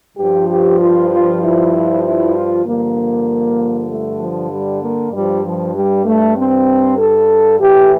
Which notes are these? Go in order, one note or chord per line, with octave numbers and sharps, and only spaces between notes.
G2 F3 G4
G4
F4
F4
E4
E4
F4
G2 D3 F3 A#3
A3
F3
G3
A#3
G2 F3 G3
F3
G3
A3
C4
A4
A2 E3 G4